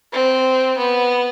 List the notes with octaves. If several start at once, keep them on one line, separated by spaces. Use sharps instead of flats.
C4
B3